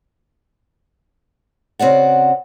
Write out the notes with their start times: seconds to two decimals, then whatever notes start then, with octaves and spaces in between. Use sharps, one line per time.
1.79 C#3 C4 F#4 D5 F#5